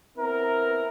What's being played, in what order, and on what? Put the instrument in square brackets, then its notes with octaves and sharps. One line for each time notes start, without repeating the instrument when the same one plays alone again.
[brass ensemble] B3 C4 E4 A#4